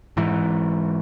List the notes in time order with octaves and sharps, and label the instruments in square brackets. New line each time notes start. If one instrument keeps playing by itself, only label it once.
[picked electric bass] G#2 E3